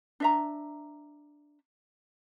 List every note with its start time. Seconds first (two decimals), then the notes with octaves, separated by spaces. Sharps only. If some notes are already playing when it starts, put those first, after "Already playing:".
0.20 D4 E5 A#5